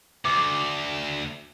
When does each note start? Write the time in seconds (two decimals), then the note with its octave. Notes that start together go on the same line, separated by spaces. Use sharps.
0.25 D2 D6